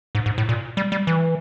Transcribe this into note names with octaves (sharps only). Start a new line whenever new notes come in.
G#2
G#2
A2
A#2
G3
G3
E3